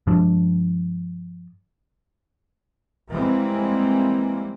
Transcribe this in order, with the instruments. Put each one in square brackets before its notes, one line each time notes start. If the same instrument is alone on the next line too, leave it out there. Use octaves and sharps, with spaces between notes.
[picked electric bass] G2 F3 G#3 D4
[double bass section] E3 G3 G#3 A#3 C4